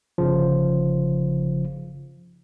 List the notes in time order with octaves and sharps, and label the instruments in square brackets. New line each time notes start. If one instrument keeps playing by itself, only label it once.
[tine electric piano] G1 C#3 F3